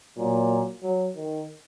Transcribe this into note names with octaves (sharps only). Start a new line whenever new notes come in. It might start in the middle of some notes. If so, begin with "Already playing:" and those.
A#2 F#3
F#3
D#3